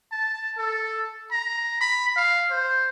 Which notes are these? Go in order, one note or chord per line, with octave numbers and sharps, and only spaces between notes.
A5
A4
A#5
B5
F5
C5